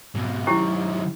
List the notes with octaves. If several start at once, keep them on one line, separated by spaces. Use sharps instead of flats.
G#2 B2
D#3 F#3 C#4 E4 G4